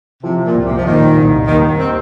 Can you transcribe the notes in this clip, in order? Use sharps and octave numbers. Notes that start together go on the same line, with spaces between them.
C3 F3
A#2
C2
C3
F3
A#2 D#3
C2
D#2 D#3
C4